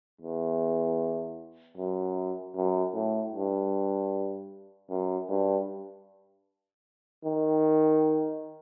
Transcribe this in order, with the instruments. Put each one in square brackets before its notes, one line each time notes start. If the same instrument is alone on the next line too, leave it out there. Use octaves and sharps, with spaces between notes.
[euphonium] E2
F#2
F#2
A2
G2
F#2
G2
D#3